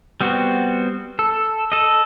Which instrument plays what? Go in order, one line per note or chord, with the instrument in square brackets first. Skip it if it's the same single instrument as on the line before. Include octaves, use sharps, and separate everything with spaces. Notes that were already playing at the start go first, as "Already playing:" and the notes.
[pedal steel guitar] G3 B3 C4 F#4
A4
A4 D#5